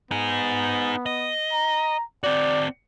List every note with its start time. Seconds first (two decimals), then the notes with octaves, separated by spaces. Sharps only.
0.11 B3 D#4 G#4
1.06 D#5
1.52 A#5
2.24 C4 F#4 D5